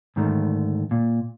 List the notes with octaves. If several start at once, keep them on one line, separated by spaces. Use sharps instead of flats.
G#2 D3 D#3 A3
A#2